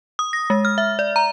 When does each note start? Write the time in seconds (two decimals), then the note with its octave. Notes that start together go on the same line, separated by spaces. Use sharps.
0.19 D#6
0.33 A#6
0.50 G#3
0.65 F6
0.78 E5
0.99 D5
1.16 A#5